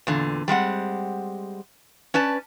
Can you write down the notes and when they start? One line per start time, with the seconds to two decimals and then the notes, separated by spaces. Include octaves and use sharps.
0.07 E2 A#2 D3
0.48 G3 G#3 C4 F#5
2.14 C#4 B4 D5 A5